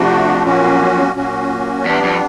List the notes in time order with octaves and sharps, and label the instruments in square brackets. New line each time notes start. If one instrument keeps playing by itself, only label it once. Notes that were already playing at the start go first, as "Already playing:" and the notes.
Already playing: [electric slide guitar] F2 [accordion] C3 F3 A3 D4 F#4
[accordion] A#2 F#3 A#3 C#4 F#4
A#2 F#3 A#3 C#4 F#4
[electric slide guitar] E2 [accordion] G3 B3 D4
[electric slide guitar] F2